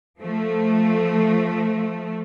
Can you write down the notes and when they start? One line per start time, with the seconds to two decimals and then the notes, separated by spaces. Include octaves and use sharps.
0.20 F3 A3